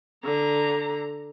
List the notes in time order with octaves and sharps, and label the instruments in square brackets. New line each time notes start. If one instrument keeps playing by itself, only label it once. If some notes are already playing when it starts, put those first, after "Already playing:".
[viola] D3 A#5